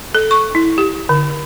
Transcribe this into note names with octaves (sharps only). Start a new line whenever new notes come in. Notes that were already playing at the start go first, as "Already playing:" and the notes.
A4
C#6
E4
G4
D3